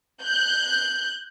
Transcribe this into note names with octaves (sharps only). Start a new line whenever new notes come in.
F#6 G6